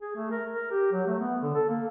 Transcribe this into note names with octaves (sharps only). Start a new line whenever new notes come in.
G#4
A3
A#4
A#4
G4
F#3
A3
B3
D3
A4
A#3